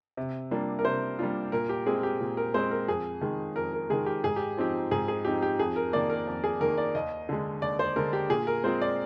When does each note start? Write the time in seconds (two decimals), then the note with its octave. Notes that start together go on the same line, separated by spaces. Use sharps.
0.17 C3
0.51 G3 A#3 D4 F4
0.79 A#4
0.85 C3 C5
1.19 G3 A#3 D4 F4
1.52 A#2 A#4
1.69 G4
1.86 G#3 C4 G#4
2.03 G4
2.20 A#2
2.37 A#4
2.54 G#3 C4 C5
2.71 A#4
2.88 F2 G#4
3.21 D#3 G#3
3.56 F2 A#4
3.73 A#4
3.90 D#3 G#3 G#4
4.06 G4
4.24 G#2 G#4
4.36 G4
4.57 F3 C4 D#4 G4
4.91 G#2 G#4
5.08 G#4
5.25 F3 C4 D#4 G4
5.42 G4
5.59 F2 G#4
5.76 A#4
5.93 D#3 A#3 D5
6.10 A#4
6.27 F2
6.44 G#4
6.61 D#3 A#3 A#4
6.78 D5
6.95 D#2 D#5
7.29 D3 G#3
7.62 D#2 D5
7.79 C5
7.96 D3 G#3 A#4
8.13 G4
8.30 A#2 G#4
8.47 A#4
8.64 G#3 C4 F4 C5
8.81 D5